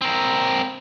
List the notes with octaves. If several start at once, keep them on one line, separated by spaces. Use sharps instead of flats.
C4 A#4